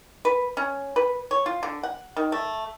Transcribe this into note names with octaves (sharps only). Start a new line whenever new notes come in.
B4
C#4
B4
C#5
F4
D3
F#5
D#3
A3